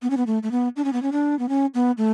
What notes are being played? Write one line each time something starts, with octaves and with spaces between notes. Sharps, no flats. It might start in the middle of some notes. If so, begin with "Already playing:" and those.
B3
C#4
B3
A3
A3
B3
D4
C#4
B3
C#4
D4
B3
C#4
B3
A3